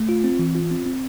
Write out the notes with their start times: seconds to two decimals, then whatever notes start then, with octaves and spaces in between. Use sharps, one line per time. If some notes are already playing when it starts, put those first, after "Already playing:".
Already playing: A3
0.09 F4
0.24 C4
0.39 E3
0.55 F4
0.71 C4
0.86 C4